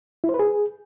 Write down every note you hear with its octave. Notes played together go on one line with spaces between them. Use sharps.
E4
C5
B4
G#4